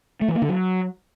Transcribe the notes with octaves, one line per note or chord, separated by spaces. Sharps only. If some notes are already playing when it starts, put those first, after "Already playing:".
A3
E3
A#3
D3
F#3